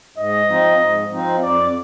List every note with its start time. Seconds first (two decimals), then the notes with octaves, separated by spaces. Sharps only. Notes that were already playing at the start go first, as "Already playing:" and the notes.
0.17 G#2 D#5
0.49 F3 C4 D#4
0.80 G#2
1.12 F3 C4 D#4
1.42 F2 D5